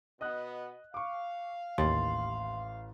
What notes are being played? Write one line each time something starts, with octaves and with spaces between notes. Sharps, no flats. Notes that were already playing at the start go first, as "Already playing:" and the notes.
B2 B3 D#5 D#6 F#6
F5 C#6 D6
A1 D#2 C6 A6